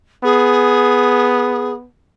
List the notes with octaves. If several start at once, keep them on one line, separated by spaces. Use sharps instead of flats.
B3 G#4